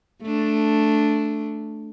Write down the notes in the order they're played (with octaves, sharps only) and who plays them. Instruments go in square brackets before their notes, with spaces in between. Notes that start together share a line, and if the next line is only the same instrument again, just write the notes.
[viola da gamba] A3 D4